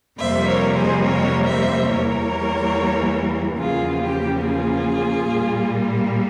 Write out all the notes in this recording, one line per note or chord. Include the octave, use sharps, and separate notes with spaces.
F2 C3 G3 A#3 C5 E5
A#4 C#5
G#4 C5
A#4 C#5
C5 E5
E2 E3 G3 A#3 A#4 C#5
E2 C#3 F3 A#3 F4 G#4
G4
F4 G#4
A#2 G3 A#3